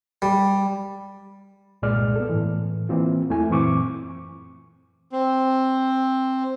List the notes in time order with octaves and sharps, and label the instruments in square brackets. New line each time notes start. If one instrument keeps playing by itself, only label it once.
[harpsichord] G3
[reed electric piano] C2 G2 A#2 G#3 D5 F6
B3 A4
A2 E3
E3 A#3 C4 F4
E2 A3 E4 G#5
F#2 A#2 E3 C4 C#6 D6
[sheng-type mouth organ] C4